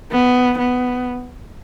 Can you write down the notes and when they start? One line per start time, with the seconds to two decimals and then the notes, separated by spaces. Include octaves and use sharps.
0.12 B3
0.58 B3